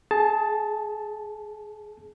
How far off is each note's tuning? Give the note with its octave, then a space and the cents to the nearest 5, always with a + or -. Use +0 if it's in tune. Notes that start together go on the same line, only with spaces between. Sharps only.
G#4 +25 A5 +0